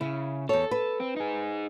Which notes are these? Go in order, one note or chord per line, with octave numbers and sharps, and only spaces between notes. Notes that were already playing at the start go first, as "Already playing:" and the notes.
C#3 E4
E2 A4 C#5
B4
C4
D#4 G#4